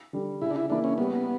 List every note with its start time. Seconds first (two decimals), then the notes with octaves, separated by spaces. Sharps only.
0.13 D3 G3
0.41 C#3 E4
0.51 D4
0.56 E4
0.70 E3 A#3 D4 E4
0.84 C#4
0.98 G3 B3